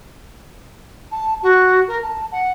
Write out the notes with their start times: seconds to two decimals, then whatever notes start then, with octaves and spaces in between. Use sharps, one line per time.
1.11 A5
1.42 F#4
1.88 A#4
2.03 A5
2.32 F#5